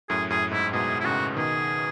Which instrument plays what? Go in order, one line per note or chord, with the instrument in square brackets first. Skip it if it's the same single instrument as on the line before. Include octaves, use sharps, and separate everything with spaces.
[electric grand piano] F#2 A2 [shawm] G#4
[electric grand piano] F#2 A2 [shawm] G#4
[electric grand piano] G#2 [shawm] E4
[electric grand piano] G#2 B2 [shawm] G#4
[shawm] E4
[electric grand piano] A2 C#3 [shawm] F#4
[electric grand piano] B2 D#3 [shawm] G#4